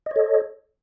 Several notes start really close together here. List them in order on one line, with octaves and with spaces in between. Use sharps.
D#5 C#5 A4